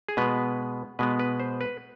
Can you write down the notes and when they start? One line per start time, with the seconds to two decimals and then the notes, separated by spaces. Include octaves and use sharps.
0.09 G#4
0.17 B2 G#3 B3 B4
0.99 B2 G#3 B3 B4
1.19 B4
1.40 C5
1.61 B4